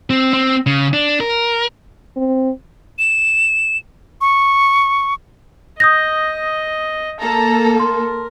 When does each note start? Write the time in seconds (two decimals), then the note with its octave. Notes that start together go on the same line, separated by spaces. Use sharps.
0.10 C4
0.33 C4
0.66 C#3
0.93 D4
1.20 A#4
2.16 C4
2.99 E7
4.21 C#6
5.80 D#5 D#6 G6 A#6
7.20 A#3 A4 A#5
7.80 A#4 C6